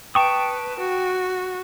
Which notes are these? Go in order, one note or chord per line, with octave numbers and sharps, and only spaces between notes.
B4 G5 A5 C#6 D#6 D7
F#4